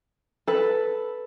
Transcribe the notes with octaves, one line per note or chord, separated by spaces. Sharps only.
A4 B4